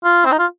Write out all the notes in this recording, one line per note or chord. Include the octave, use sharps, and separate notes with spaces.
F4
C4
D#4
F4